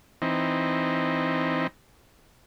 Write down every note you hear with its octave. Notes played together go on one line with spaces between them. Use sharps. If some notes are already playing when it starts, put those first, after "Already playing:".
E3 C4 D#4